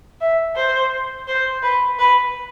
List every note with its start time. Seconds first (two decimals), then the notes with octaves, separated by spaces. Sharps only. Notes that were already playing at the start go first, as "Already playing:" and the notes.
0.21 E5
0.56 C5
1.27 C5
1.63 B4
1.99 B4